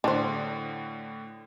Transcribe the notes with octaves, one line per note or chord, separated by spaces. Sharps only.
A2 D3 D4 C5